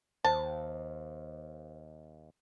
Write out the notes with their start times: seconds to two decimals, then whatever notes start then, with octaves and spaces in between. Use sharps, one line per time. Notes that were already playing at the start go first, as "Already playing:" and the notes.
0.24 D#2 C5 A5